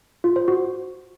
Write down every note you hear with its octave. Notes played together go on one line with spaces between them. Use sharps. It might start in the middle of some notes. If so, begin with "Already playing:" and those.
F4
C5
F#4